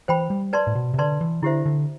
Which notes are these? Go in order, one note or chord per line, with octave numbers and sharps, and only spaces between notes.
E3 C5 G5 B5
G3
B4 D5 A5 C6
A2
B2
C3
D3 B4 D5 A5 C6
E3
D3 E4 G4 C5 E5
D3